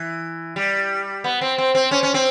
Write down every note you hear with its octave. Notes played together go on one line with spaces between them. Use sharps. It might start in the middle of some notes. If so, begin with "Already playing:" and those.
Already playing: E3
G3
B3
C4
C4
C4
C#4
C#4
C4